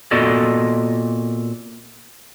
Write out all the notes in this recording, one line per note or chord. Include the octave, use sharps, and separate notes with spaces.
A#2 B3 F#4 A4 D5 D#5